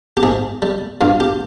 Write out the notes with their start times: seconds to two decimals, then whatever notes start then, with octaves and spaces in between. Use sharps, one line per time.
0.17 G4
0.23 G#2 G#4
0.62 G3
1.01 G2 F4
1.20 G4